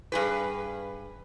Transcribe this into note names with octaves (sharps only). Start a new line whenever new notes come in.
G2 G#4 B4